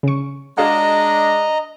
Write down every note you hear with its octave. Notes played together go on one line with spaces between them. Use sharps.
C#3 C#6
G#3 D4 F#4 G#4 D#5 F5 A#5